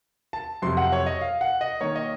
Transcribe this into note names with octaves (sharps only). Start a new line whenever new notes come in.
A5
F2 C3 F#3 C6
F#5
C#5
D#5
F5
F#5
D#5
D#3 A#3 D#4 C#5
D#5